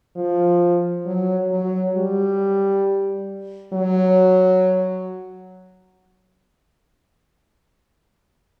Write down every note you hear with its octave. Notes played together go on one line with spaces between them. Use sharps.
F3
F#3
F#3
G3
F#3